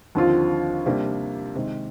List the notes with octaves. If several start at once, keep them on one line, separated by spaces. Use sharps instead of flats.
D#2 D3 F3 C4 F4
C3 G3 A#3 D4
C3 D#3 G#3 C4